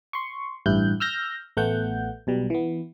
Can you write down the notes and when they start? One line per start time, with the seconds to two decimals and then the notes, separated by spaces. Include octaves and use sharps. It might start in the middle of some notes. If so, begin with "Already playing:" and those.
0.13 C6 C#6
0.66 A1 G2 E4 F#6 G6
1.00 E6 F6 G6 A#6
1.57 A1 A3 B3 F#5 G6
2.27 B1 B2 G3
2.50 E3 B3